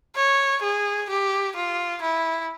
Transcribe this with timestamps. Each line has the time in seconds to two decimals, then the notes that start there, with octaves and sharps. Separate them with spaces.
0.16 C#5
0.63 G#4
1.10 G4
1.56 F4
2.02 E4